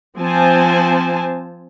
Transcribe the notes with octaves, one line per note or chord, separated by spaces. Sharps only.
F3 C4 C5 G#5 A5